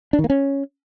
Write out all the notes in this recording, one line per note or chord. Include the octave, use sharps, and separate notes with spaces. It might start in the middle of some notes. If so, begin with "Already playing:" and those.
D4
D#3
A#3
C#4